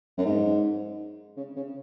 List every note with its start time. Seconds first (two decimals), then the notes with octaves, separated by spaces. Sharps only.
0.18 F#2
0.25 G#2
1.37 C#3
1.56 C#3